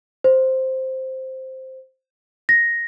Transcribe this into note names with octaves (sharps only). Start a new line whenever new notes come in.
C5
A#6